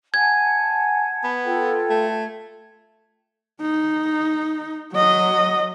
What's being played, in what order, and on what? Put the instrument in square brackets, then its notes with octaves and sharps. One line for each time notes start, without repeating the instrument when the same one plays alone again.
[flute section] F#5 G#5 A5 [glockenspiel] G#6
[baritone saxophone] B3
[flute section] F4 A4 G5
[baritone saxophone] A3
[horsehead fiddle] D#4
F#3 D#5